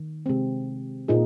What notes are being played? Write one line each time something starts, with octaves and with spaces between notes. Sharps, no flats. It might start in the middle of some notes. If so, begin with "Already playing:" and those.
Already playing: D#3
C3 G#3 C4
A#2 A#3 D#4 G#4